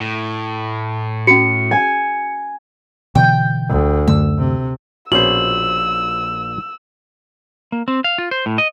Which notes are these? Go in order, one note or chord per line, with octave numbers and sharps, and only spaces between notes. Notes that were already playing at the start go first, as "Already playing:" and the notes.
A2
C#4 F#4 C#7
G#5
B2 D3 E3 G5
D2
F#2 D3 A3 E6
C3
A#1 B2 C#4 C5 E6 F#7
A#3
C4
F5
F4
C5
A2
D#5